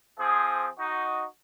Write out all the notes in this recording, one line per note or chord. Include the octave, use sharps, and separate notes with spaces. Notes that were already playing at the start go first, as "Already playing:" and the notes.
F3 C4 G#4
D#4 F#4